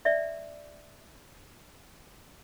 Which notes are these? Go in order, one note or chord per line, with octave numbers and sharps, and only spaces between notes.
D5 E5